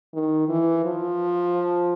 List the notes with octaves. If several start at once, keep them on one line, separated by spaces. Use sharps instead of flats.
D#3
E3
F3